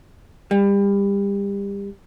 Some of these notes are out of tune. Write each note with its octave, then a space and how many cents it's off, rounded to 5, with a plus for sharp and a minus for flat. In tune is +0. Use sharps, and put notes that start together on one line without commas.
G3 +30